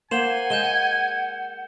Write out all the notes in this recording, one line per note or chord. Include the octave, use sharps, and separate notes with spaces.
A#3 C5 F#5 G#5 E7 F#7 G7
G#3 G6 E7 G7